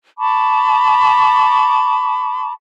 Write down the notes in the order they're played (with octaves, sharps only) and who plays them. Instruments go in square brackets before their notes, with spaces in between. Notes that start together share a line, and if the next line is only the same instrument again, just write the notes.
[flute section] A5 B5 C#6 D6